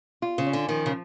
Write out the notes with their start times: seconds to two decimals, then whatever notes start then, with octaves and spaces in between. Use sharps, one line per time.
0.22 F4
0.38 C#3
0.46 C#4
0.53 D3
0.69 D#3 F3
0.86 C#3